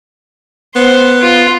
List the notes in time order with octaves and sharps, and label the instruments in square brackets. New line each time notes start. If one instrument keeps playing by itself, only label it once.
[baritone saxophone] B3 [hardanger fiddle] C5
[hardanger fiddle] F4